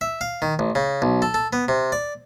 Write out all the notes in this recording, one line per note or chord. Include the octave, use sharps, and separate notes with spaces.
E5
F5
D#3
A1
C#3
B1
A4
A4
B3
C3
D5